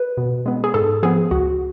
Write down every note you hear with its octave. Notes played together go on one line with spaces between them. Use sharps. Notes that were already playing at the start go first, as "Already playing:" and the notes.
Already playing: B4
B2
G#3 B3
G#4
G#2 A4
F3 B3 G#4
C#2 F#4